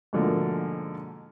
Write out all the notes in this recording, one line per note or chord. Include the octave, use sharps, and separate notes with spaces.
G#2 B2 D3 F3 A3 A#3